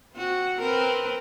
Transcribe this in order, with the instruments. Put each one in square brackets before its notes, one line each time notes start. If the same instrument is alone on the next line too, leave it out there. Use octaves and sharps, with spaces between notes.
[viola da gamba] C4 F#4
C4 A#4 B4